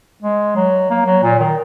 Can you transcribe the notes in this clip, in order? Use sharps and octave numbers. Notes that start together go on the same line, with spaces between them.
G#3
F#3
A#3
F#3
A#2
D#3